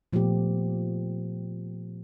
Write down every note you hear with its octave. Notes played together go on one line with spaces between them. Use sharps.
A#2 F3 A3 B3 G4